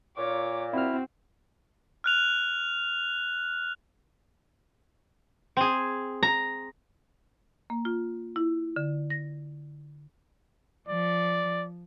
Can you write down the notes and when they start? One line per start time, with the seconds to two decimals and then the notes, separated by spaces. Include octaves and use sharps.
0.17 A#2 C#5 D6
0.73 C4 E4 F#4 F6
2.04 F6 F#6 F7
5.57 C4 G#4
6.23 A#5
7.70 A#3
7.85 F4
8.36 E4
8.76 D3
9.10 A#6
10.88 F3 D5